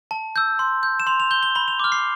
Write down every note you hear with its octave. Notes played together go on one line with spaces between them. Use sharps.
A5
E6 G6
C6
G6
E7
C6 F7
F7
G6 G7
G7
B5 G7
F7
D6 F6
C7